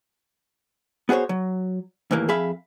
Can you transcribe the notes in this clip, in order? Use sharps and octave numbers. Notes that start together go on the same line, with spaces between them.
B3 F#4 G#4 C5 C#5
F#3
D#2 A2 E3 A#3
F2 G#4 E5 F5 B5